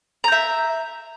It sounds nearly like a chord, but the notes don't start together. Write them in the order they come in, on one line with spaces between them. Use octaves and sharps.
A#5 G6 E5